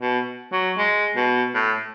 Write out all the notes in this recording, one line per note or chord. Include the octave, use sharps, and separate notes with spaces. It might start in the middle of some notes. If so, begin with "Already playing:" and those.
B2
F#3
G#3
B2
A2